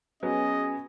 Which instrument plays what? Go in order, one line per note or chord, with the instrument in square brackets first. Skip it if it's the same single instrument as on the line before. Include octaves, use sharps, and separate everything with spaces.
[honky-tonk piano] F#3 B3 [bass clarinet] C#4 [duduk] G#4 [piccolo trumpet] D#5